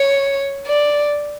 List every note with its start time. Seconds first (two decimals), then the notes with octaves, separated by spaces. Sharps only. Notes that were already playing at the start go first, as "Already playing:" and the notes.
Already playing: C#5
0.67 D5